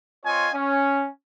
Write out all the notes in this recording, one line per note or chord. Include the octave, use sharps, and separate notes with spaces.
C4 F4 C#5 D#5 G#5
C#4